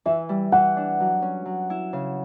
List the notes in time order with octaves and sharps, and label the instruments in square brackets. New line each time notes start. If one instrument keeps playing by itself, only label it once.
[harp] E3 [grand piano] E5
[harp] G3
[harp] E3 [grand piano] F#5
[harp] D4
F#3
C#4
F#3
E4
C#3